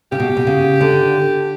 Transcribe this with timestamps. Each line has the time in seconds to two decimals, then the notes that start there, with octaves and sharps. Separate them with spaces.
0.12 C#3 G4
0.20 B2
0.37 B2
0.47 C#3
0.81 D3